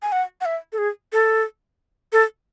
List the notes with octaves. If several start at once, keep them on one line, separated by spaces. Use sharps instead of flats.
G#5
F#5
F#5
E5
A4
G#4
A4
A4